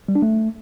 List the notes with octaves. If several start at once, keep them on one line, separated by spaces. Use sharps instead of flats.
G3
D4
A3